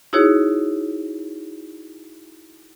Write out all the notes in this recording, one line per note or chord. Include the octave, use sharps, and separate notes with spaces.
D#4 E4 F#4 G#4 C#5